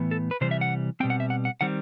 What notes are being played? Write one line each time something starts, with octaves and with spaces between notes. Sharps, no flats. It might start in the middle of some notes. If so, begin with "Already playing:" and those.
Already playing: A2 E3 B3
A4
B4
C3 E3 G3 C5
E5
F#5
B2 G3 C4 G5
F#5
E5
F#5
F#5
D#3 G3 C4 F#5